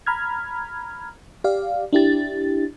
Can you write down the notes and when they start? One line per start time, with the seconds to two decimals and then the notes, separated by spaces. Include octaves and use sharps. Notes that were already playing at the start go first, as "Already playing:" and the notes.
0.06 A#5 B5 F6 G#6
1.44 G4 D5 F5
1.93 D4 E4 G4 A6